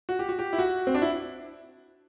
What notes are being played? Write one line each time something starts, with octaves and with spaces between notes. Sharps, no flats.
F#4
G4
F#4
G4
E4
F#4
C4
D4
E4